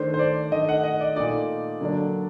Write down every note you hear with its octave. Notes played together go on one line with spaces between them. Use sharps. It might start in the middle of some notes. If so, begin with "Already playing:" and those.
Already playing: D#3 A3 D4 C5
C5
D5
D#3 A3 D4 D#5
F#5
D#5
D5
A#2 A3 D#4 D5
D3 F#3 A#3 D4